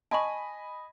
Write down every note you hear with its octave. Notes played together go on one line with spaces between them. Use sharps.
D#5 G#5 A5 B5 C#6